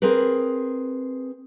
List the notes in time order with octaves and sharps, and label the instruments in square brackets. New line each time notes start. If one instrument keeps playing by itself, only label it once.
[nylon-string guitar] C4 G#4 A#4 B4